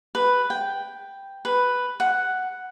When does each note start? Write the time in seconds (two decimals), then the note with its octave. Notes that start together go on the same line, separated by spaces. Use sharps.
0.15 B4
0.50 G5
1.45 B4
2.00 F#5